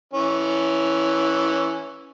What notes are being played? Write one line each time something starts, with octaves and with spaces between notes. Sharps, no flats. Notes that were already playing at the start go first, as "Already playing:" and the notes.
E3 C#4